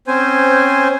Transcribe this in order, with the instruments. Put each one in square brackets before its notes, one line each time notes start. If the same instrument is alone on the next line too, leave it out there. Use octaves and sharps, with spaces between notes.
[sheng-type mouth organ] C4 C#4 C5 G#5